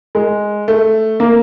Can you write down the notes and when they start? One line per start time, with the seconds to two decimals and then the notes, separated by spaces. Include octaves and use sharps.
0.15 G#3
0.68 A3
1.20 A#3